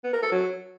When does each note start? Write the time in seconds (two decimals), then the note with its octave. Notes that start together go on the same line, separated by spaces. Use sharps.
0.04 B3
0.13 A#4
0.22 A4
0.31 F#3